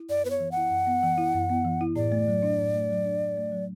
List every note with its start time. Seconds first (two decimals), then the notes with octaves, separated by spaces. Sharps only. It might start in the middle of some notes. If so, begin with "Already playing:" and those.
Already playing: E4
0.09 F#2 D5
0.25 B3 B4
0.30 C#5
0.40 E3
0.51 F#5
0.57 E4
0.71 F#2
0.87 B3
1.03 E3
1.18 E4
1.34 F#2
1.50 B3
1.64 E3
1.81 E4
1.96 A2 D5
2.12 A3
2.28 F#3
2.43 D4
2.58 A2
2.75 A3
2.90 F#3
3.06 D4
3.21 A2
3.37 A3
3.52 F#3